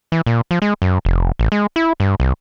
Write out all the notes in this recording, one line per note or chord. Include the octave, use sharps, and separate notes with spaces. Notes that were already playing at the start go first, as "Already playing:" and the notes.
E3
A#2
F3
G#3
F#2
F1
A1
G#3
E4
G2
C2